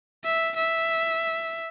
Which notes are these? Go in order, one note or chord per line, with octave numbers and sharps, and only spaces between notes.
E5
E5